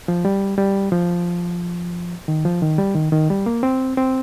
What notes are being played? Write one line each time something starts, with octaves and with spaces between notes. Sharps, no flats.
F3
G3
G3
F3
D#3
F3
D#3
G3
D#3
D#3
G3
A#3
C4
C4